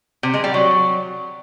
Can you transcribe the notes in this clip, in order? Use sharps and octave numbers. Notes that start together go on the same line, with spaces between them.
C3
G#3
G3
F#3